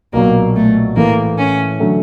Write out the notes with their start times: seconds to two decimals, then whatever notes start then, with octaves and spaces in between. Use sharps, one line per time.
0.13 B1 A#2 F#3 A#3
0.55 A3
0.96 A2 E3 A3 A#3
1.38 C#4
1.80 D3 F#3 A3